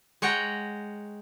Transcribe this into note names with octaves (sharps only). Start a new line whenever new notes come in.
G#3 C#5 F#5 G5 A#5